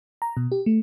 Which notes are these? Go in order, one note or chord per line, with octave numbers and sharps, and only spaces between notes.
A#5
B2
G4
A3